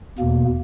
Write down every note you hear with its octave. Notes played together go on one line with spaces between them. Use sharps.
E2 B2 A#3